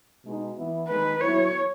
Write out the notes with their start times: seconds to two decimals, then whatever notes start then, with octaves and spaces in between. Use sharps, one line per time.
0.24 B2 G#3 D#4
0.56 E3 B3 E4
0.88 D#3 G#3 D#4 B4
1.21 F#3 B3 E4 C#5